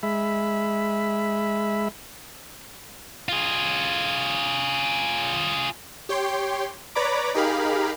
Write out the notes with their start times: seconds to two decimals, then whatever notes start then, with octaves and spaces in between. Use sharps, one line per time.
0.03 G#3 E5 B5
3.29 F4 G#4
6.09 G4 C#5 G5 C6
6.95 B4 C#5 D5 A#5 B5 D6
7.35 D#4 G4 G#4 A#4 F5 B5